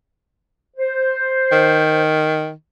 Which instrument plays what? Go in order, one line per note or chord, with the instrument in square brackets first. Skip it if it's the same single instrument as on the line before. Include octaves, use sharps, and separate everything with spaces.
[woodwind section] C5
[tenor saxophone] D#3